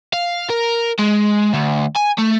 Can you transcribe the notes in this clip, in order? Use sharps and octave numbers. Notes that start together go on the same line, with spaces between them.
F5
A#4
G#3
D2
G#5
A3